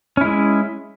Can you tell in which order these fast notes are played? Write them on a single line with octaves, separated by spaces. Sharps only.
C#4 E4 G#3